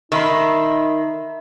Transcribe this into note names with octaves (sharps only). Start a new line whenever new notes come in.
D#3 D#4 E5 B5 C6